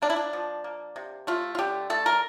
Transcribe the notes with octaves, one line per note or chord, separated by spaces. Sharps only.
A#3 D4
E4
D4
F3
A#3
C3
A3 F4
F4
D3 G4
A3 A4
A#4